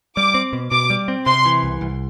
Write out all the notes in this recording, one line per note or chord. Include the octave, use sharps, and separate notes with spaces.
G3 D6
C4
B2
B2 D6
G3
C4
C3 C6
E3
C2
C2